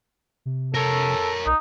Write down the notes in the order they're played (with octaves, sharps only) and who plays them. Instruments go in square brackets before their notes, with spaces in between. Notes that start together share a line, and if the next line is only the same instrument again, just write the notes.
[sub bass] C3
[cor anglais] A4 [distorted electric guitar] A#4 C#5
[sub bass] B1 [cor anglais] D#4